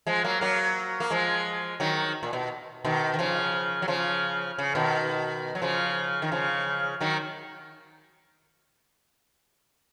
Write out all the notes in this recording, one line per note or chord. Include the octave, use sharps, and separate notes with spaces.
F3 G#3
F#3 A#3
F#3 A#3
A#3
F3 G#3
D#3 F#3
A#2
B2
B2 D#3
D#3
C#3 F3
F#3
C#3 F3
C#3
B2 D#3
F#3
C#3 F3
D#3
C#3 F3
D#3 F#3